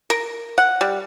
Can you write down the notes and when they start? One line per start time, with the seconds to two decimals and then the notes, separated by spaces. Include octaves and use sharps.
0.10 A#4
0.58 F#5
0.81 G3